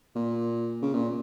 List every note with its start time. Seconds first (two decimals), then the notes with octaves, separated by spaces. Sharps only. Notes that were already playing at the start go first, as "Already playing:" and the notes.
0.15 A#2
0.82 C#3
0.94 A#2